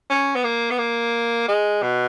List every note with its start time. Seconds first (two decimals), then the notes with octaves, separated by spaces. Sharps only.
0.10 C#4
0.36 B3
0.44 A#3
0.71 B3
0.78 A#3
1.48 G#3
1.82 B2